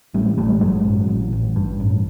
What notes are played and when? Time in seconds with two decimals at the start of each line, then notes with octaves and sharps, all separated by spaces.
0.14 A1 G3 A3
0.38 A1 G3 A3
0.61 G2 F#3 G#3
0.85 A1
1.09 A1
1.33 A1
1.56 G2
1.80 A1